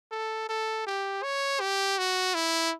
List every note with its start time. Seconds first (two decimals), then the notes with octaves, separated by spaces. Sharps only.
0.12 A4
0.49 A4
0.87 G4
1.23 C#5
1.61 G4
1.98 F#4
2.35 E4